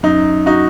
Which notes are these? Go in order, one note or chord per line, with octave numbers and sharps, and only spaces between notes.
F#2 D#4
D#4 F#4